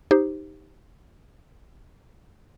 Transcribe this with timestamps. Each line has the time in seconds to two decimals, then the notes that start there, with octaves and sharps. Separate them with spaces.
0.11 D#4 G4 C5